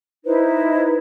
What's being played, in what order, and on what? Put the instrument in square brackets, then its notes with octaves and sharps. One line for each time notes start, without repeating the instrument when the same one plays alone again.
[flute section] D#4 E4 B4 C5